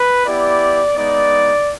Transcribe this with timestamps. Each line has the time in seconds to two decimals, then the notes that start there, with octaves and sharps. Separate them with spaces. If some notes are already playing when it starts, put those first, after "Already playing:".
Already playing: B4
0.26 B3 E4 G4 D5
0.97 G#3 B3 D#4 D5